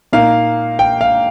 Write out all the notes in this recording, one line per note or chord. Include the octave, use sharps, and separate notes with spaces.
A#2 A#3 D#4 F5
G5
F5